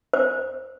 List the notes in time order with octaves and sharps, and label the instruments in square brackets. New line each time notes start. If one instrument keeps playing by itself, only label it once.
[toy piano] C5